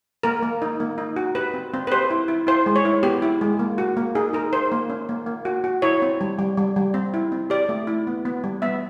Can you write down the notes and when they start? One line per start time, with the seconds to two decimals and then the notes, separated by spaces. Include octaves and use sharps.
0.23 A#3 A#4
0.43 A#3
0.62 D#4
0.80 A#3
0.98 D#4
1.16 F#4
1.35 G4 B4
1.54 C4
1.74 C4
1.87 B4
1.92 G4 C5
2.11 E4
2.28 E4
2.47 E4 C5
2.66 G#3
2.76 C#5
2.85 E4
3.03 B3 G4
3.22 E4
3.41 G#3
3.59 A#3
3.78 F#4
3.97 A#3
4.15 D#4 G#4
4.33 D#4 A#4
4.52 D#4 C5
4.72 A#3
4.90 C#4
5.09 A#3
5.26 A#3
5.45 F#4
5.64 F#4
5.82 E4 C#5
6.02 C4
6.21 G3
6.39 G3
6.57 G3
6.76 G3
6.94 C4
7.14 E4
7.32 C4
7.50 G4 D5
7.69 A3
7.87 E4
8.07 B3
8.25 B3
8.44 G3
8.62 B3 E5